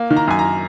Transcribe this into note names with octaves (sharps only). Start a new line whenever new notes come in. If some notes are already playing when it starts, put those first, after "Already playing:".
Already playing: A#3
D#3
A#5
F#2 G#5
A#5